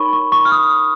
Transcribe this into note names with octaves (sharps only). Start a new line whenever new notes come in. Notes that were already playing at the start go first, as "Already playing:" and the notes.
Already playing: D#4 A#4 C#5 B5 C#6
C#6
C#6
F6
D#6